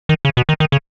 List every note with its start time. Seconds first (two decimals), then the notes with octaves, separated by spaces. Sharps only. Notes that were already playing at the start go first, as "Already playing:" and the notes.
0.09 D#3
0.25 C#3
0.37 B2
0.49 D#3
0.60 D#3
0.72 C#3